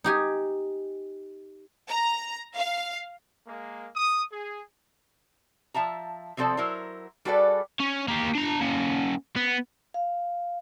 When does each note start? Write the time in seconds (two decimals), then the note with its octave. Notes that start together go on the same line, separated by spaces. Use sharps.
0.04 D#4 G4 G#5
1.89 A#5
2.56 F5
3.47 G#3 A#3
3.96 D#6
4.32 G#4
5.74 F3 E5 A5 A#5
6.37 C3 F3 C4 A4 D5 A5
6.57 F#3 E4 A#4 C5
7.25 G3 F#4 G#4 A4 B4 D5
7.80 C#4
8.08 A#3 G4
8.35 D4 A#5
8.61 A#3 C#4
9.36 B3
9.94 F5